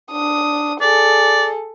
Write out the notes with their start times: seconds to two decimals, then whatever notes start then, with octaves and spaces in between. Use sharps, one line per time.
0.12 D4 D#6
0.81 G#4 A4 D5